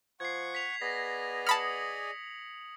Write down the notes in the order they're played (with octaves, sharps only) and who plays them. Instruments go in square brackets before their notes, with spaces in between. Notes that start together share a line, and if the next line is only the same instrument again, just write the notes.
[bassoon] F3 [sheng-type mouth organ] F#5 C#6 [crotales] G#6 C7
[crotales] B6 F7
[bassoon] B3 [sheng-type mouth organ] G#4 D5 D#5 [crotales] A#6
[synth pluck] A5 B5 F6 [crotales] D#6 C#7 F#7